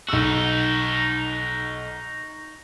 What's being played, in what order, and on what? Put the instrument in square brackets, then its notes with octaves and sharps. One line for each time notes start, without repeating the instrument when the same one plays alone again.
[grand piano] B1 E6 [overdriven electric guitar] D#4 F#4